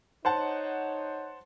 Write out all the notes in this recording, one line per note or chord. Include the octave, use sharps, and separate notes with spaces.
D#4 C5 C#5 F#5 A5